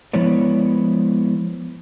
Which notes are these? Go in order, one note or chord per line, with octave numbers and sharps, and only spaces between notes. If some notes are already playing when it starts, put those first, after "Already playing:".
F3 G#3 B3 E4 C#5 D5